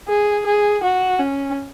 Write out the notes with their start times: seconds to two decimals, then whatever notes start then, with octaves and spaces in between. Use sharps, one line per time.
0.08 G#4
0.46 G#4
0.83 F#4
1.19 C#4